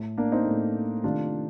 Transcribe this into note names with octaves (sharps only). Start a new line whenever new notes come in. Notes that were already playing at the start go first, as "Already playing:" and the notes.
Already playing: A2 A3
A#3 D4
C4 D#4
A2 A3
C3 D#3 A3 D4 F4